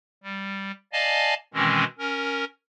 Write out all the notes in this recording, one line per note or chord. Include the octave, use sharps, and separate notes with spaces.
G3
D5 D#5 F5 G#5 A5
B2 D#3 E3 G#3 C4 C#4
C#4 A#4